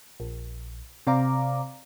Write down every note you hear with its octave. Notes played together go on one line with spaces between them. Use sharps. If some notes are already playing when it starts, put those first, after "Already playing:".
A#1
C3 C4 D5 F5 A#5 D6